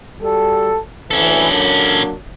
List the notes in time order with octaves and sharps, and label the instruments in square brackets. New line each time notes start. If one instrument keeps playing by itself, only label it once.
[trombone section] G3 F#4 A4
[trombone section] D2 E3 [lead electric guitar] C#4 A4
[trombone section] F#3 A#3 D4